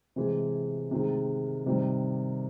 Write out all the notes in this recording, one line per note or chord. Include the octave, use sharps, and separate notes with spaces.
C3 E3 G#3
C3 D#3 G#3
C3 D#3 G3